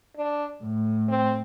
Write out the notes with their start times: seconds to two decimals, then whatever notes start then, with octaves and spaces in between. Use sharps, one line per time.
0.17 D4
0.63 A2
1.09 C4